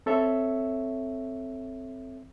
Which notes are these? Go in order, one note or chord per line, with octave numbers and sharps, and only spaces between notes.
C4 A4 C#5 E5